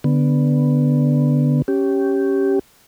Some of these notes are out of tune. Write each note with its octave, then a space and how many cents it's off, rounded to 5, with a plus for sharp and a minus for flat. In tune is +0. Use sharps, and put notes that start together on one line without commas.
D3 +0 B3 +0
C#4 +0 G4 -10